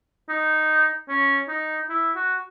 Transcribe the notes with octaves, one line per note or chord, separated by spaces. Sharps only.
D#4
C#4
D#4
E4
F#4